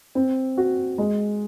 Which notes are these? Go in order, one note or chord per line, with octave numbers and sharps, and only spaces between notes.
C4
F#4
G#3